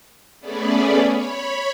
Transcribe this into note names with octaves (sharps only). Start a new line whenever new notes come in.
A3 B3 C#4 G#4 B4 D5
C#5 B5